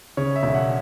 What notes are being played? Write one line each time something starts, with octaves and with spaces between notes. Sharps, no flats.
C#3 C#5
E5
E1
F#5